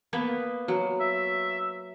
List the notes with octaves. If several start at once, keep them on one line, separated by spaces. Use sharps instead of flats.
A#3 B3 B4
F#3
E5